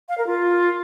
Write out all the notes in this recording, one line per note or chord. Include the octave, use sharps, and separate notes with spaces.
F5
A#4
F4